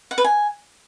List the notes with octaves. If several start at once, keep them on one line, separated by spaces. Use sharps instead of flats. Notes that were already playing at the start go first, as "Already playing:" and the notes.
F#5
B4
G#5